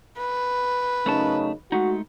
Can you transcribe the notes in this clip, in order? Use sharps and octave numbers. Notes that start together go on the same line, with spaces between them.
B4
F#2 C#3 A3 C#4 D#4 A5
G#3 A3 D#4 F#4